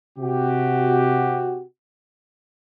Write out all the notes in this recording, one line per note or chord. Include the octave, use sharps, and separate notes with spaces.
C3 F#4 G4